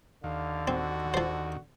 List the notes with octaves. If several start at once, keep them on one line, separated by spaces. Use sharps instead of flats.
D#2 D3 F5
C4 F#4
F3 C5